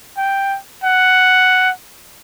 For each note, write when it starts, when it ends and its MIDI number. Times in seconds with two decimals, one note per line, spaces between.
0.17 0.57 79
0.84 1.70 78